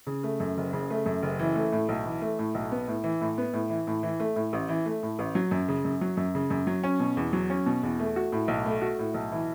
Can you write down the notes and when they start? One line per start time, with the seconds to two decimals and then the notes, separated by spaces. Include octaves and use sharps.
0.07 C#3
0.23 A3
0.40 F#2
0.57 F#1
0.73 C#3
0.90 A3
1.06 F#2
1.22 F#1
1.39 E3
1.55 A3
1.72 A2
1.89 B1
2.06 E3
2.22 A3
2.39 A2
2.55 B1
2.72 B3
2.88 A2
3.04 E3
3.21 A2
3.38 B3
3.53 A2
3.70 E3
3.87 A2
4.03 E3
4.20 A3
4.36 A2
4.53 A1
4.69 E3
4.86 A3
5.03 A2
5.19 A1
5.35 F#3
5.51 F#2
5.68 C#3
5.85 F#2
6.01 F#3
6.17 F#2
6.35 C#3
6.50 F#2
6.67 F#3
6.84 C#4
7.00 B2
7.17 E2
7.33 F#3
7.50 C#4
7.66 B2
7.83 E2
7.99 A3
8.16 F#4
8.32 A2
8.48 B1
8.65 A3
8.82 F#4
8.99 A2
9.14 B1
9.32 E3